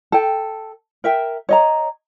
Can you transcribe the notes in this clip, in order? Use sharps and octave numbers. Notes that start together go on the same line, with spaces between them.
A4 G5
A#4 E5 G5
C#5 D#5 A#5